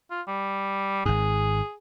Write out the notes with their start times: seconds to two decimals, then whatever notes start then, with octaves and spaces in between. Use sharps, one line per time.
0.11 F4
0.28 G3
1.06 G#1 G#2 G#4